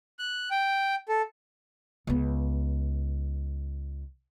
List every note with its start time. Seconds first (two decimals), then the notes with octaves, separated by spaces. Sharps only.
0.19 F#6
0.51 G5
1.09 A4
2.07 C#2 B3